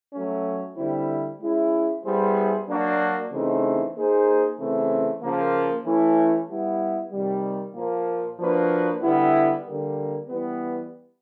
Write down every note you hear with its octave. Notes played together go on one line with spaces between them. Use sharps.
F#3 A3 C#4
D3 G3 C4 E4
G#3 C#4 E4
G3 B3 E4 G#4 C5
F#3 A#3 D4 F#4
C#3 E3 A3 C4 D#4
A#3 D#4 G#4 C5
C#3 E3 A3 C4
C#3 F3 A#3
E3 A3 C#4 E4
G3 B3 E4
C3 D#3 G3
A#2 F3 A#3
F3 A#3 D4 F#4 B4
D3 G3 B3 E4
D3 G3 A#3
E3 G3 B3